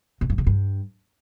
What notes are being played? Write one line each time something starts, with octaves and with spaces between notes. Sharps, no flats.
B2
G2
C#3
G2